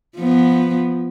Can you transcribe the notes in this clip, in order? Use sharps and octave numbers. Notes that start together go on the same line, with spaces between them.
F3 B3